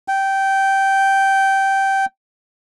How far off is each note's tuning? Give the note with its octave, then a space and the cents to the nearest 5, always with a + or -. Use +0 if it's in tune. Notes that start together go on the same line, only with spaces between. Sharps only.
G5 -15